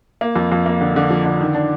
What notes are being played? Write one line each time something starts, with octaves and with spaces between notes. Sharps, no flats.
A#3
F2
F2
A#3
D3
D3
F3
D3
D#3
D4